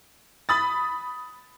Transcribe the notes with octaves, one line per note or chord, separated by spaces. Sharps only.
B5 D#6 A6